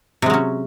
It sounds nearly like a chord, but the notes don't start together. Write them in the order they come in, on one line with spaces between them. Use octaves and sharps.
C3 G#3 F#3 C#4